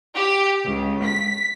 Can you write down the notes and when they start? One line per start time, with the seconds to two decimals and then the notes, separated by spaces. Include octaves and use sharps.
0.17 G4
0.65 C#2
1.03 B6